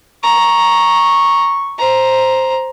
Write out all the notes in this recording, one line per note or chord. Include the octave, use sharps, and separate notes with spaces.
A#5 C#6
C5 A#5